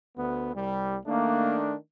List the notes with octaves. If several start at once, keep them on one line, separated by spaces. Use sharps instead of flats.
D2 B3
C2 G3
D#3 A3 A#3 D4